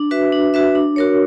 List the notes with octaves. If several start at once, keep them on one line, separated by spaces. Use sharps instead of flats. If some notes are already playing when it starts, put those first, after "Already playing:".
Already playing: D4
F#4 B4 E5
D4
F#4 B4 E5
D4
F#4 A#4 C#5